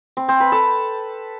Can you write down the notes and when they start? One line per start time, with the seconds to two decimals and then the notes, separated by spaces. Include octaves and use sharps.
0.17 C4
0.29 C4
0.40 B4
0.52 A4